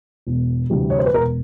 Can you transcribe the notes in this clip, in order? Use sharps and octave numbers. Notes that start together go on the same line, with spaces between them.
E1
D2 C3 E3 G3
C#5
C5
B4
E1 A#4